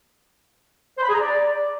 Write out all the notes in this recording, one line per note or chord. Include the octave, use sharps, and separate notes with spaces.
C5
B5
G#4
A#5
D5